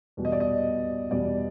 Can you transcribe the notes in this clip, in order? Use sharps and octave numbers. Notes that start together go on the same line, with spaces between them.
E2 B2 G3
D#5
D5
D#5
E2 B2 G3 D5